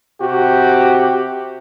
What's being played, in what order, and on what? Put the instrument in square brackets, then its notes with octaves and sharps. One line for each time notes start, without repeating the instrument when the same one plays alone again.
[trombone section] C3 F#4 G4